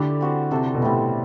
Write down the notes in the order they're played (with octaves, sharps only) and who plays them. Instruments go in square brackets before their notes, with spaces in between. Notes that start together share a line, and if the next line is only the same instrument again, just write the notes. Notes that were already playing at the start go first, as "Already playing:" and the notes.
Already playing: [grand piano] D3 [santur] A3 E4 G4 D5
[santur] C4 F#4 C5
[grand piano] C3 [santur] D4 A4 C5
[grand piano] B2
[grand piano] A2 [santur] G3 C4 E4